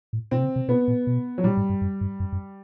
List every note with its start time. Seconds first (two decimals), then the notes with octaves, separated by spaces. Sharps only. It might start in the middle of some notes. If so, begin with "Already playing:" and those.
0.13 A2
0.31 B2 C4
0.38 C3
0.44 C#3
0.56 C3
0.68 B2 B3
0.88 A#2
1.07 B2
1.38 F#3
1.44 A#2 G3
1.57 G#2
1.70 G2
1.82 F#2
2.01 G2
2.20 F#2
2.32 F#2